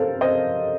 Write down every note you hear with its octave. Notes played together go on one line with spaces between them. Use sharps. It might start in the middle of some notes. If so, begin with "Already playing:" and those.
Already playing: A4 A#4 C5 F5
C5 D#5